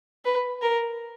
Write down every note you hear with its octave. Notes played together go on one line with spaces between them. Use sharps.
B4
A#4